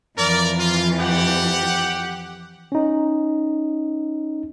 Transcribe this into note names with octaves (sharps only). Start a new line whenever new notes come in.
F2 E3 A#4 D5
F4
G4 F#5
C#4 D#4